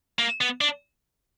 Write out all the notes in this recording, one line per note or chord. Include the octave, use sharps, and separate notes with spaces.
A#3
B3
D4